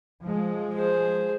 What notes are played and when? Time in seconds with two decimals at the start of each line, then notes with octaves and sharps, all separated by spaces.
0.23 F3 G#3
0.75 G#4 C5